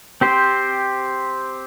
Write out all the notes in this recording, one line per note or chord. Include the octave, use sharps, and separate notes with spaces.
C4 G4 C5